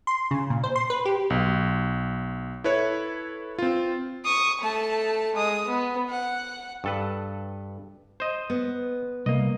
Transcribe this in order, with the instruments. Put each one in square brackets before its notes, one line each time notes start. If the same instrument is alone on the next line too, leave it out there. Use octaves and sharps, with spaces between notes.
[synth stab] C6
C#3
A#2
C5
C6
B4
G4
[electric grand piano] B1
E4 A4 B4 C#5
C4 F4
[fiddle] C#6 D#6
A3 A5
G#3 D#6
B3
F#5
[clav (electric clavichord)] G2 A4 B4
C5 D#5
[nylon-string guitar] B3
[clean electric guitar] C2 A#3 [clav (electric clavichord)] D#5